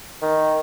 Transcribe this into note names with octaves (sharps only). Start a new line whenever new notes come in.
D#3